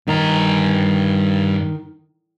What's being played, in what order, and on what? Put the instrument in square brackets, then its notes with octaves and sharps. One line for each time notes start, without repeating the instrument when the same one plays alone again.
[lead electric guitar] G2 A#5 [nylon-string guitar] D#3